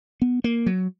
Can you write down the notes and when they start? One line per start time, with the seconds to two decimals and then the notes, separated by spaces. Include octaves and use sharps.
0.22 B3
0.44 A#3
0.66 F#3